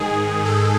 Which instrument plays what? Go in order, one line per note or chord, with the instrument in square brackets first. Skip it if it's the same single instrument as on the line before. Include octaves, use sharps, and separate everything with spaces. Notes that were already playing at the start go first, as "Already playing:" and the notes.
Already playing: [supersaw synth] G#2 D#3 G#4
A4